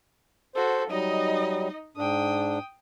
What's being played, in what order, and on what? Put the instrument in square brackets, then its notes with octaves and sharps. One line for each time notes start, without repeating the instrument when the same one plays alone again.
[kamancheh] F#4 A4 [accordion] C5
[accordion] F#3 G3 [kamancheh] D#4 D#5
[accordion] G#2 D4 [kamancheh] G5 D#6